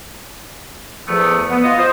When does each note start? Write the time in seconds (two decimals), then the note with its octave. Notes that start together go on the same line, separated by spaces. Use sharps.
1.08 E2 F3 A3 B3
1.49 B3
1.64 F4 D#5
1.78 C5